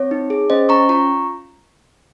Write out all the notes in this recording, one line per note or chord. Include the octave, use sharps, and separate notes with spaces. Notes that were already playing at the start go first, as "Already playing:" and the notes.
Already playing: C4 C#5
D#4
G#4
C#4 C5 D#5
C#4 A#5 C#6
F4 A#5 C#6